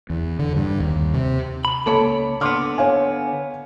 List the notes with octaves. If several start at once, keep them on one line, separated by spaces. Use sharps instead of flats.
E2
D3
G2
D#2
C3
B5
C#2 A#3 A4 C#5 B5
D3 B3 C6 D6 F6
C#5 F5 G#5